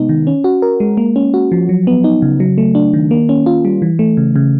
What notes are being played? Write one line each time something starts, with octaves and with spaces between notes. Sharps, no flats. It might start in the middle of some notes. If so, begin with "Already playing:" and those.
Already playing: C3 G#3 B3 D#4
D#3
C#4
F#4
A#4
G#3
A#3
C#4
F#4
F3
F#3
B3
D#4
C#3
F#3
A3
D4
D#3
A#3
C#4
F4
G3
E3
A3
C#3
C#3